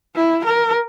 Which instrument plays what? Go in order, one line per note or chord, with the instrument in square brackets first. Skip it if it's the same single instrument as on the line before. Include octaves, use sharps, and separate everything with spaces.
[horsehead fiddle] E4
A#4